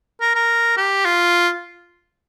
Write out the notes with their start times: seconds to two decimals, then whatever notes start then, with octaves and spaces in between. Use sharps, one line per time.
0.21 A#4
0.35 A#4
0.77 G4
1.05 F4